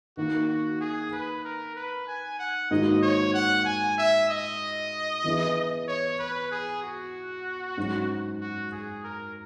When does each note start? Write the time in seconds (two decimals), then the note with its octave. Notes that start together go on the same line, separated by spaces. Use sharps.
0.17 D#3 A#3 D#4 F#4
0.49 F#4
0.81 G#4
1.12 B4
1.44 A#4
1.76 B4
2.07 G#5
2.39 F#5
2.71 G#2 D#3 A#3 D#4 F#4 D#5
3.02 C#5
3.34 F#5
3.65 G#5
3.98 E5
4.29 D#5
5.24 E3 B3 E4 G#4
5.88 C#5
6.19 B4
6.51 G#4
6.82 F#4
7.77 G#2 F#3 C#4
8.40 F#4
8.72 G#4
9.04 A#4